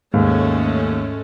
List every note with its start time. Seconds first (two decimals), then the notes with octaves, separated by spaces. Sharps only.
0.14 D#2 G#2 G#3 A3 C#4